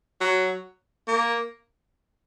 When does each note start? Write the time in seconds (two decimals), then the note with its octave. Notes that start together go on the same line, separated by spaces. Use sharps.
0.21 F#3
1.08 A#3